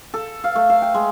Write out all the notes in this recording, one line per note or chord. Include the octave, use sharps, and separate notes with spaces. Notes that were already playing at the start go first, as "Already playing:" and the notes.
A4
F5
A3
F5
G5
G#3